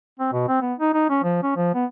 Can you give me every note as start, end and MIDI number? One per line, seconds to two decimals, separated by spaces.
0.20 0.31 60
0.33 0.45 47
0.48 0.61 60
0.62 0.74 59
0.79 0.92 63
0.94 1.07 63
1.10 1.20 61
1.23 1.39 53
1.43 1.52 61
1.57 1.74 53
1.75 1.85 59